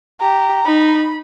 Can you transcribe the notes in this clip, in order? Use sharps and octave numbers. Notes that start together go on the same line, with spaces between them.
G4 A#5
D#4 B5